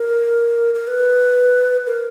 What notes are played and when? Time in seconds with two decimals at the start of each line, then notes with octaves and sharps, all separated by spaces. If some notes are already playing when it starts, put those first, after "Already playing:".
Already playing: A#4
0.74 A#4
0.87 B4
1.86 A#4